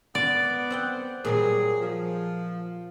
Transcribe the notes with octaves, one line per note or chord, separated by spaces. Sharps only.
B3 D5
C4 F#5 G5
A#2 F#3 G3 G#4
F3